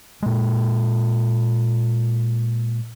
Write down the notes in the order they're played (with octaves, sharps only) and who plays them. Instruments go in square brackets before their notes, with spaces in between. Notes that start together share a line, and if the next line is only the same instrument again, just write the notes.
[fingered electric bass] A#2 G#3